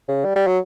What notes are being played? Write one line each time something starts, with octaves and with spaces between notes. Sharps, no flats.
C#3
G3
G3
F#3